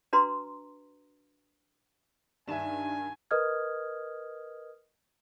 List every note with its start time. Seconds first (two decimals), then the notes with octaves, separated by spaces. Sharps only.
0.13 D4 F#4 B4 A#5 C6
2.48 G2 D#3 D4 D#4 E5 G#5 E7
3.31 A#4 B4 D#5 D#6 F6 G#6